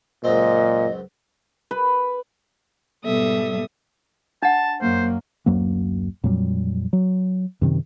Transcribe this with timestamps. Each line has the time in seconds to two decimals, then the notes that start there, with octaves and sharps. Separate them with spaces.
0.24 C#2 F#2 A#2 C4 D#5
1.71 B4
3.04 G#2 B2 G3 A4 E5 D#6
4.43 D4 F#5 A5
4.81 F#2 A#3 C5
5.46 D1 F#2 F#3 A#3
6.24 F2 A#2 F#3 G3
6.93 F#3
7.61 F#2 C3 D#3